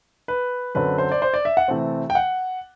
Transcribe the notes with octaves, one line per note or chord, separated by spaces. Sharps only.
B4
F#2 D3 F#3 C4 B4
C5
D5
C5
D5
E5
F#5
C3 E3 A3 C4
G5
F#5